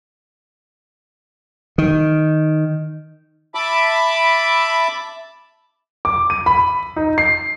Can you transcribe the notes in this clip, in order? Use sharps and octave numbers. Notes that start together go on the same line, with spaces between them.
D#3
E5 A5 B5 D6
D6
D#7
B5
D#4
C7